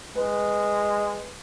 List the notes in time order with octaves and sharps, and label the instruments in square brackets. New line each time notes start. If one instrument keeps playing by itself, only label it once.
[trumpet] G#3 [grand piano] B4